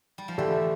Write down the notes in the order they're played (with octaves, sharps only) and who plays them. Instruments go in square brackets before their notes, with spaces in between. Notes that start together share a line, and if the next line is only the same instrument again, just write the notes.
[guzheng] G3
F3
[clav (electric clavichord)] D3 A3 D4 G4 [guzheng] E3